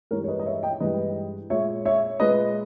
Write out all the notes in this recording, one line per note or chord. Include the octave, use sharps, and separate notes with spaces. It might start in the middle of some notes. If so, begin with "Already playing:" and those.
G2 E3 G#3 A#4 C#5
C#5
B4 D#5
D#5
C#5 E5
D#5 G5
G2 E3 G#3 B4 D#5
A#2 G#3 C#5 E5
C#5 E5
A#2 G#3 B4 D#5